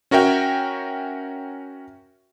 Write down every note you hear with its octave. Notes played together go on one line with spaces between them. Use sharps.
C#4 F#4 A#4 E5 G5